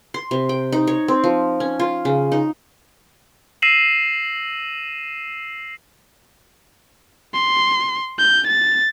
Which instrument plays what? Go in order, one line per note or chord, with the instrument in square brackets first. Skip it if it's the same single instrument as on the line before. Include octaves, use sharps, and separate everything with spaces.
[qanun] C6
C3
G5
D#4
C#5
C4
F3
C#4
F4
C#3
D#4
[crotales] E6 A#6 C7 D#7 E7 F#7
[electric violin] C6
G6
A6